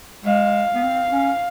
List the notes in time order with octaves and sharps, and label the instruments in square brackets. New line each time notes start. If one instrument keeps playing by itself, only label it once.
[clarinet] G#3 [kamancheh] F5
[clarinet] B3
C4
C#4